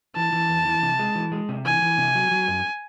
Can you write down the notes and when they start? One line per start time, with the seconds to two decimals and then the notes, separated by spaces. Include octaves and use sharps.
0.16 E3 A5
0.33 E3
0.49 E2
0.66 E3
0.83 C3
0.99 G#3
1.15 E3
1.32 G#3
1.49 C3
1.65 E3 G#5
1.82 E3
1.98 C3
2.15 F#3
2.31 F#3
2.48 F#2